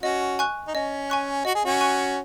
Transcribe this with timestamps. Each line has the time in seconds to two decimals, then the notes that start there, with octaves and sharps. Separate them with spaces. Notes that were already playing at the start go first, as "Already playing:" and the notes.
0.03 C#4 F#4 D#5
0.39 G#5 C#6 F#6
0.68 D#4
0.75 C#4 D#5
1.10 G#5 C#6 F#6
1.45 F#4 D#5
1.55 G#4
1.65 C#4 F#4
1.81 G#5 C#6 F#6